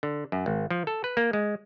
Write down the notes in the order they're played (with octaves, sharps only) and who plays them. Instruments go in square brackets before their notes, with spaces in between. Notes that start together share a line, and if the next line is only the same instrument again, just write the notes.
[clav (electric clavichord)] D3
F#2
G#1
F3
A4
B4
A#3
G#3